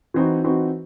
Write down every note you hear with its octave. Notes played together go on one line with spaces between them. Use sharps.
E3 C4 D#4 F#4
E3 C4 D#4 F#4